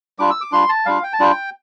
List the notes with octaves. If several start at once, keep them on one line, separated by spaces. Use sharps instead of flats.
G3 D4 F4 D6
E6
D6
G3 D4 F4 C6
A5
G3 D4 F4 F5
G5
A5
G3 D4 F4 G5